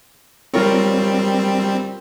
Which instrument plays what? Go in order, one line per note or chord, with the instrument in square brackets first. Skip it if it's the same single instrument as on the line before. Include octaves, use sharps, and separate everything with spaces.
[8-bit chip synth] G3 C4 [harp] F4 A#4 C#5